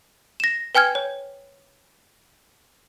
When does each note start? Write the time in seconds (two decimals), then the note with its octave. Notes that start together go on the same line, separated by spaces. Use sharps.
0.40 A#6 E7
0.75 B4 G5 G#5 F6 G#6
0.95 C#5